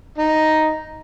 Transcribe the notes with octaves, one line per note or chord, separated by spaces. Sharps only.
D#4